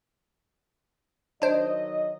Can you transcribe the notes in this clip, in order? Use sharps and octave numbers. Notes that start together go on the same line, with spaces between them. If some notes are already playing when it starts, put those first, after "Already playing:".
D#3 F#3 D4 C5 D#5